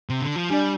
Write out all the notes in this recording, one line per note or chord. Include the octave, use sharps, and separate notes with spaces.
C3
D3
F3
G3 D4 F4 D5